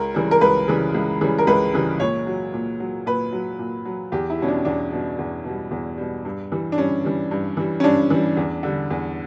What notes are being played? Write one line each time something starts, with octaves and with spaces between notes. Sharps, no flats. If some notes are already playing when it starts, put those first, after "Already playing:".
Already playing: C#2 A#4
C#3 E3 G3
A#4
C#2 B4
C#3 E3 G3
C#2
C#3 E3 G3
A#4
C#2 B4
C#3 E3 G3
A#2 C#5
F#3
A#2
F#3
A#2 B4
F#3
A#2
F#3
E2 G4
E4
B2 G3 C#4
D4
E2 D4
B2 G3
E2
B2 G3
E2
B2 G3
G2
E3 G3
D4
G2 C#4
E3 G3
G2
E3 G3
C#4
G2 D4
E3 G3
E2
D3 G3
E2